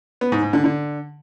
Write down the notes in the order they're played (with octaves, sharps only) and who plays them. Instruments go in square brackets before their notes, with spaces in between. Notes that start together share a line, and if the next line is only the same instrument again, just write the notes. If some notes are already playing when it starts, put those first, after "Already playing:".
[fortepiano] B3
G#2
G#2
D3
D3